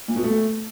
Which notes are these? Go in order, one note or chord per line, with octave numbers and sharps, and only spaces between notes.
A#2
B2
A3